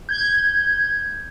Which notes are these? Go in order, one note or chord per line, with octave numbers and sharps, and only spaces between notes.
G6 G#6